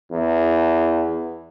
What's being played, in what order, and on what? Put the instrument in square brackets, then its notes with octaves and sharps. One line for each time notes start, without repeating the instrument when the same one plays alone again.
[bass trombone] E2